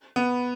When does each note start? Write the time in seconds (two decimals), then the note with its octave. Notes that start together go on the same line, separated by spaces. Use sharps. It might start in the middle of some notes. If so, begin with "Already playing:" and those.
0.16 B3